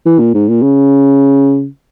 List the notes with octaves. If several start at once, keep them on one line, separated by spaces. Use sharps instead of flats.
E3
A#2
G#2
A#2
C#3